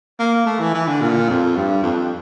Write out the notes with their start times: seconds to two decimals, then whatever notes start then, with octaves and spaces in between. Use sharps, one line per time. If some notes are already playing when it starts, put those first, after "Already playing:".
0.20 A#3
0.46 A3
0.60 E3
0.74 E3
0.88 D3
1.01 A#2
1.29 F2
1.56 G2
1.82 F2